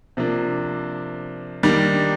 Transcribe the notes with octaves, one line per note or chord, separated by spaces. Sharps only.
C3 F3 A#3 D4
D#3 G3 A#3 D4